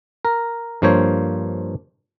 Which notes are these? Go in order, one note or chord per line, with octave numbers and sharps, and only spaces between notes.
A#4
G2 F3 A#3 C5 C#5